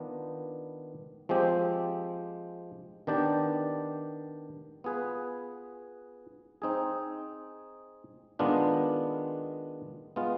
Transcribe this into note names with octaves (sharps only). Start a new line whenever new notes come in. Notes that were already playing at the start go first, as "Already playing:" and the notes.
Already playing: D#3 B3 D4 F4
F3 G#3 C4 G4
D#3 B3 D4 G4 D5
B3 F4 G#4 B4
C4 D#4 G#4
D#3 G#3 B3 D4 F4
G#3 B3 F4